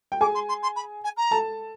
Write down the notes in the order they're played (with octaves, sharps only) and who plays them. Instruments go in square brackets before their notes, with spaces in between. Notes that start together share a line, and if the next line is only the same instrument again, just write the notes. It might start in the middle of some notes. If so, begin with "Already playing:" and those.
[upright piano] G5
[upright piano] G#4 G#5 [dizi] D6
[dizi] C6
C6
C6
B5
G#5
A#5
[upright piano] A4 A5